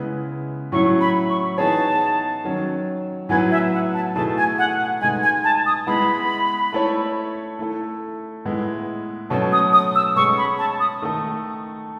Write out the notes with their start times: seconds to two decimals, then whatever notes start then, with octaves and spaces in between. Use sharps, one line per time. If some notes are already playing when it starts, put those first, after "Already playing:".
Already playing: C#3 G#3 B3 E4 B4
0.72 A2 F#3 C#4 E4 C#6
1.01 B5
1.30 C#6
1.57 E3 B3 D#4 G#4 C#5 A5
2.44 D#3 F#3 C#4
3.29 A2 F#3 B3 E4 B4 G#5
3.51 E5
3.73 F#5
3.94 A5
4.15 B2 A3 E4 G#4 A5
4.37 G#5
4.58 F#5
4.80 F#5
5.01 B2 G#3 D#4 G#5
5.23 G#5
5.44 A5
5.66 D#6
5.87 G#3 B3 E4 B5
6.73 A3 E4 A4 C#5
7.59 A3 E4 A4
8.45 A2 G#3 B3 E4
9.30 B2 F#3 A3 C#4 A5
9.52 D#6
9.73 D#6
9.95 E6
10.16 B2 G#3 C#4 G#4 C#6
10.38 B5
10.59 A5
10.80 D#6
11.02 D#3 A3 D#4 A4